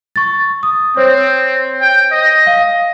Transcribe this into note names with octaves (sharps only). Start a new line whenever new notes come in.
C#6 A6
D#6
C4 C5 C#5
G5
D#5
F5